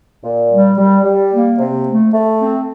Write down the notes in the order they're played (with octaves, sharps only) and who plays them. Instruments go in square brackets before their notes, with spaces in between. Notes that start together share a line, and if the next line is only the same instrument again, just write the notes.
[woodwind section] A#2
G3
G3
G3
A#3
C3
A3
A3
C4